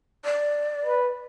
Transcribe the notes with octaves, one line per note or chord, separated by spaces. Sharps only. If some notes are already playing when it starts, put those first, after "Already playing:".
D5
B4